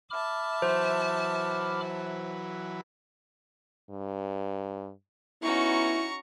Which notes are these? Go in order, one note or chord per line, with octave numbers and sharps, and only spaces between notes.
E5 A5 B5 D6 F6
E3 F#3 B4 C5
G2
B3 C#4 D#4 E4 F#4 A#5 C#6